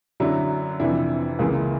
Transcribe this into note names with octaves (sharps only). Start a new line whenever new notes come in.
F#2 D3 F#3 D4 E4
F2 C3 E3 D4 E4
C#2 C#3 E3 G#3 A#3